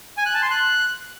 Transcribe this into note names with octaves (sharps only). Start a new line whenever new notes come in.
G#5
F#6
A5
C6
F#6